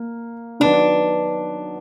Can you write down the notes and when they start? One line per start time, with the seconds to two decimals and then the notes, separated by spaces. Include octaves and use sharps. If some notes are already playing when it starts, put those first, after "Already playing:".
Already playing: A#3
0.60 D#3 F#3 B3 D4